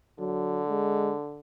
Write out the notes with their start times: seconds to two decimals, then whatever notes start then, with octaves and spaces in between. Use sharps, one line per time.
0.19 D3 F#3
0.68 G#3